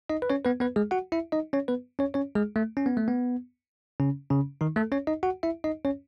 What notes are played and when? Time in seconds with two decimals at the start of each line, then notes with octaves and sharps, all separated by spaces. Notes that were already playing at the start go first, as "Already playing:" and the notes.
0.10 D#4 D#5
0.22 B4
0.30 C#4 C#5
0.45 B3 B4
0.60 B3 B4
0.76 G#3 G#4
0.91 F#4 F#5
1.12 E4 E5
1.32 D#4 D#5
1.53 C#4 C#5
1.68 B3 B4
1.99 C#4 C#5
2.14 C#4 C#5
2.35 G#3 G#4
2.56 A3
2.77 C#4
2.86 B3
2.97 A3
3.08 B3
4.00 C#3 C#4
4.30 C#3 C#4
4.61 D#3 D#4
4.76 A3 A4
4.92 C#4 C#5
5.07 D#4 D#5
5.23 F#4 F#5
5.43 E4 E5
5.64 D#4 D#5
5.85 C#4 C#5